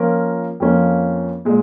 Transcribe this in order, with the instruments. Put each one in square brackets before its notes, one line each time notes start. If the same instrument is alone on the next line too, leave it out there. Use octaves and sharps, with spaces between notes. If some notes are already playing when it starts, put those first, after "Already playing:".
Already playing: [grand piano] F3 A#3 C#4 F4 A#4
F2 F3 A#3 C#4
A#2 G#3